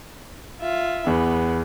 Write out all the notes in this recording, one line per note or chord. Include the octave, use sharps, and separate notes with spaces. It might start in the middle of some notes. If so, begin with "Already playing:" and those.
F4 E5
E2 B3